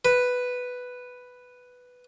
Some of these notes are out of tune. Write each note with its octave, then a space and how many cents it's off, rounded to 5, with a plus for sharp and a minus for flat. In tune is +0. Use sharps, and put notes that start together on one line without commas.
B4 +5